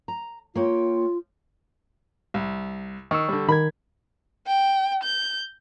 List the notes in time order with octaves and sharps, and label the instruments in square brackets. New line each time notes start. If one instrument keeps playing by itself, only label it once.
[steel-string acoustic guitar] A#5
[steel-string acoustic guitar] A#3 C#5 G5 [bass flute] F4
[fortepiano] C2
[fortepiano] D#3 [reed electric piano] C#6 E6
[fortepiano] D3 G3
[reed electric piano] D#3 A#4 G#6 [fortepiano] B5
[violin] G5
G6